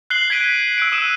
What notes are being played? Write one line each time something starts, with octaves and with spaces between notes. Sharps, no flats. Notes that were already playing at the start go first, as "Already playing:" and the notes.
F#6 C7 F#7 G7
G#6 B6 D7 D#7 G7
E6 F#6 D7
D#6 E6 D#7 E7